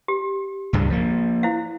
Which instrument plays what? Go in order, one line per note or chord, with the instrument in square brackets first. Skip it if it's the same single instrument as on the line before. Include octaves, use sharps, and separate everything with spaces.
[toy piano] G4
[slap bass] C#2 G2 G#3
F3 A#3
[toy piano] E4 C5 F5